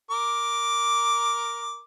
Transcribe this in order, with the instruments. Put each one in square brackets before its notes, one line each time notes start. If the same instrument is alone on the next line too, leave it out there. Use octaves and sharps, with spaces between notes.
[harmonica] A#4 D6